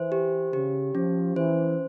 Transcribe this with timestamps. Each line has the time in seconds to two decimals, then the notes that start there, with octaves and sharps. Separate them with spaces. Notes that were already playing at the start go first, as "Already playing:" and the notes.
Already playing: E3 C5
0.12 G4
0.53 C#3 G4
0.95 F3 C#4
1.36 E3 C5